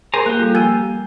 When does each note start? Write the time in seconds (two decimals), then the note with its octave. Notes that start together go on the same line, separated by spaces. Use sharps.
0.14 G#4 A#4 C5 G#5 A#5
0.26 A#3 G4 F#6
0.39 G3 F4 A4
0.55 F3 G#5 E6 G#6 D#7